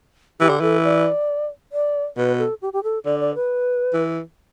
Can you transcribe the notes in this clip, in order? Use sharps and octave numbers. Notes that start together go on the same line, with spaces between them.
E3 G4
D3
E3 A4
D5
D5
B2 B4
A4
G4
G4
A4
D3 D5
D5
B4
E3